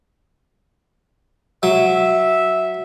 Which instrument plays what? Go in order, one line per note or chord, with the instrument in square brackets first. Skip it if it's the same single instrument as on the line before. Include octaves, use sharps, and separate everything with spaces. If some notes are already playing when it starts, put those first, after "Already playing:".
[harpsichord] F#3 [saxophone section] E5